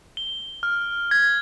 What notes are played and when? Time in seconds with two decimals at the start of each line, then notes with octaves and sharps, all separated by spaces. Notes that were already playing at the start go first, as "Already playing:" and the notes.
0.17 G7
0.63 F6
1.11 G#6